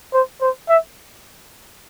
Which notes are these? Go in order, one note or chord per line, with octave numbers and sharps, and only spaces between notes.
C5
C5
E5